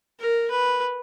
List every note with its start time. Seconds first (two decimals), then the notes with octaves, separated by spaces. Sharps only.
0.20 A#4
0.50 B4